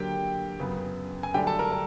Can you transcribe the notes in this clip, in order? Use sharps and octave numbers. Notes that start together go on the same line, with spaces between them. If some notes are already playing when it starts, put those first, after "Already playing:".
Already playing: D3 F#3 A#3 G4 G5
F#2 C#3 F#3 B3
G#5
G2 D3 F#3 A3 D4 G4 G5
A4 A5
A#4 A#5
A#4